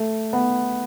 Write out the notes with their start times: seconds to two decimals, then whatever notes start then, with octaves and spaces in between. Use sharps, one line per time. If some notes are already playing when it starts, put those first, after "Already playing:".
Already playing: A3
0.33 B3